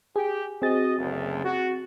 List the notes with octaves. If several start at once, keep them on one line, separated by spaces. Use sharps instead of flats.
G4 G#4
C4 F#4 G#4 D#5 A6
F#1 D2
F#4